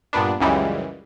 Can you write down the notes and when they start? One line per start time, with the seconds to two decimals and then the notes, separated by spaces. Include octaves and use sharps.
0.13 G2 A#2 B3 D4
0.40 C#2 F#2 C#3 E3 G3 G#3